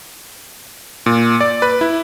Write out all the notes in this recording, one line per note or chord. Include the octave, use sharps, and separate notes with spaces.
A#2
D5
B4
E4